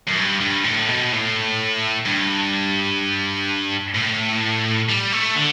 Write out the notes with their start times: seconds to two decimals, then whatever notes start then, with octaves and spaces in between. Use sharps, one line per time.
0.07 F#2
0.17 G2
0.41 G2
0.64 A2
0.88 B2
1.12 A2
2.05 G2
3.95 A2
4.89 G3
5.13 A3
5.36 D3